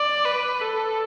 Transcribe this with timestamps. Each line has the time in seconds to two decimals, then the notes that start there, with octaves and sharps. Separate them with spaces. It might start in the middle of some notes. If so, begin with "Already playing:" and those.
Already playing: D5
0.25 B4
0.62 A4